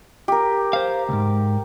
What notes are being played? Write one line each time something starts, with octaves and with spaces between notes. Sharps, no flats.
G4 A#4
C5 F5
C#2 G#2